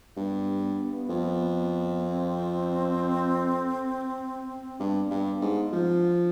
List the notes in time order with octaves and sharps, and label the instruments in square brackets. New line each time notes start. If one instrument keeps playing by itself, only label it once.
[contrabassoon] G2 [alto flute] B3
[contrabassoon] F2
[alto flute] C4
[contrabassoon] G2 [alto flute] B3
[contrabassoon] G2
G#2
[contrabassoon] F3 [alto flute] C4
[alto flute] D4